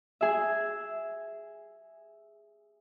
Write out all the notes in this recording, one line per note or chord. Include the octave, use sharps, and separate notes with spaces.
G#4 E5